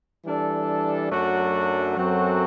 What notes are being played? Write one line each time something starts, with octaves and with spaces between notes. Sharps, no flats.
E3 G3 D4 A4
F#2 F#3 A3 D4 F#4
F#2 F#3 C4 F#4 A4